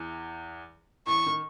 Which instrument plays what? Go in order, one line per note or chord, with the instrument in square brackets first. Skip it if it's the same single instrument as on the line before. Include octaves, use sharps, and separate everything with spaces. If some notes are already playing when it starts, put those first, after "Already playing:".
Already playing: [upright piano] E2 E3
[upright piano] E2 E3 [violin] C#6
[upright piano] D#3